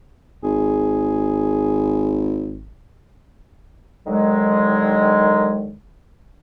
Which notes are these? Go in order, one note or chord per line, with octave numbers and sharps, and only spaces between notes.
G#1 G#4
D#2 D3 D#3 F#3 G#3